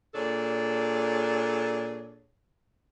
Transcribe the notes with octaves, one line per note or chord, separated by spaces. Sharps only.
A#2 D4 G#4 A4 C#5